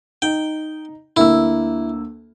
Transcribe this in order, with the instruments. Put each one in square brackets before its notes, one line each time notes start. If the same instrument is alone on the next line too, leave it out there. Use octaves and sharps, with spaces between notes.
[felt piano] D#4 [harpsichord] G5
[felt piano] D2 A#3 E6 [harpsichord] E4